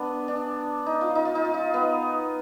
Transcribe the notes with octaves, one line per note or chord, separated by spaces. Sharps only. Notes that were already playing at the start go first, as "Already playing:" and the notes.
Already playing: B3 D4
D4
D#4
F4
D#4
F4
D#4
F4
D#4
B3